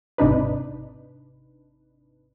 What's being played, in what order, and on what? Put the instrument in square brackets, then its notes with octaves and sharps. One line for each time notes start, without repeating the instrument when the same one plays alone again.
[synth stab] G#1 C3 D4 D#4 B4